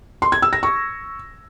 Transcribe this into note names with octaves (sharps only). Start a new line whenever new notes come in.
C6
G#6
E6
A#6
C#6